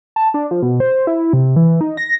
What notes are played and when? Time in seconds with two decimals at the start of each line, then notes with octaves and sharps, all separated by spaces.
0.16 A5
0.34 D4
0.51 F3
0.62 B2
0.80 C5
1.07 E4
1.33 C3
1.56 E3
1.81 D#4
1.97 A#6